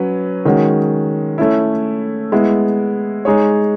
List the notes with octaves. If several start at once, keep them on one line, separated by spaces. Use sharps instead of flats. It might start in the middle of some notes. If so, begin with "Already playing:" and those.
Already playing: F#3 C#4 B4
D#3 G#3 C#4 F#4
A3 C#4 E4
G#3 B3 E4
G#3 D#4 G#4 C#5